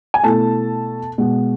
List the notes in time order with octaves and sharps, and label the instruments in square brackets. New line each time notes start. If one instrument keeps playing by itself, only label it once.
[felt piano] G#5
B2 A3 E4 A4 A5
B2 G#3 B3